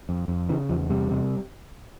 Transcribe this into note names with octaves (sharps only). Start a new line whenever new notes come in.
F2
F2
C#3 E3
E2 F3
C3 G3
C3